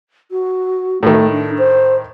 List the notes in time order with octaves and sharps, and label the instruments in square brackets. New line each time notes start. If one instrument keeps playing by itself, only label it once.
[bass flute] F#4
[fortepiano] A2 D#3 [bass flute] A3
[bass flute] D4
C5